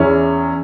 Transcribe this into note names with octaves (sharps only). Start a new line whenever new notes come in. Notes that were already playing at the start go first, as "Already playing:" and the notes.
Already playing: E2 E3 C#4 E4